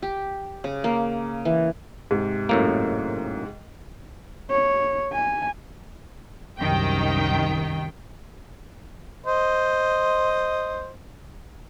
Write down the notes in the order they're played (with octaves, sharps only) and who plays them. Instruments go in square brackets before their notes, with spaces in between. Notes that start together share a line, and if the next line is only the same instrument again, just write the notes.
[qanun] G4
C#3
A#3
E3
[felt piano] G#2 C3
[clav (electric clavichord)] F#2 A2 A#3
[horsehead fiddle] C#5
G#5
[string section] C2 F#2 D#3 G5
[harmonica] C5 D#5